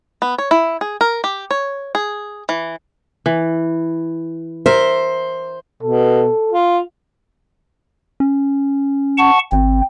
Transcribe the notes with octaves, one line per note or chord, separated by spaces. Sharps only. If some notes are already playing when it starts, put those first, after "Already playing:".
B3
C#5
E4
G#4
A#4
G4
C#5
G#4
E3
E3
A#4 C5 E5
B2 A4
F4
C#4
F#5 A5 C#6
G#1 C4